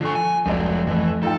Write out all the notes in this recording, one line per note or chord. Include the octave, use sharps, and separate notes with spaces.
D3 F3 A4 G#5 C#6
G#5
F1 F3 F#3 G#3 D5
F2 A2 E3
D#4 F4 A4 G5